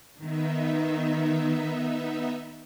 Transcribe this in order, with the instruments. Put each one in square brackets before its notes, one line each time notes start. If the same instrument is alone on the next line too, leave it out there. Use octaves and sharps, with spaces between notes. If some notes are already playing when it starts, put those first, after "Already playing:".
[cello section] D#3 [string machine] B3 D#4 E5